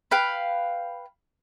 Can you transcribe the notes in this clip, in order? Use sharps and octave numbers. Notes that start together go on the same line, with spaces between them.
B4 F5 G5